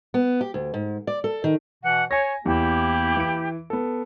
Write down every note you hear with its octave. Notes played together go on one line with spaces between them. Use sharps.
B3
G4
D2
G#2
D5
A4
D#3
B2 E3 F#5
C#5 G#5 A#6
E2 A#3 E4 G4
E3 D7
B3 A4